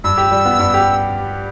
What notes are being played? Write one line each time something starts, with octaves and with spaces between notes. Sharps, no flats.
G2 E6
G4
G3
B3
G2
G4